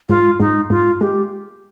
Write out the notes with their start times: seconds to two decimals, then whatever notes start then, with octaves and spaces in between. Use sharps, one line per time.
0.09 G#2 F4
0.40 G#2 D#4
0.70 G#2 F4
1.01 G#3 G4